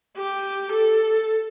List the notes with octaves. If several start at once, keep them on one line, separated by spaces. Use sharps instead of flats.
G4
A4